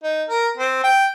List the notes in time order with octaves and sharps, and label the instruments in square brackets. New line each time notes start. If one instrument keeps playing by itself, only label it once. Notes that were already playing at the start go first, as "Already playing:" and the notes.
[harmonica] D#4
A#4
C4
G5